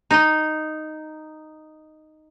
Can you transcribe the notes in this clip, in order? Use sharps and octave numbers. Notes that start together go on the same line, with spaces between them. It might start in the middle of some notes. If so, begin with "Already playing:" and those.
D#4 D#5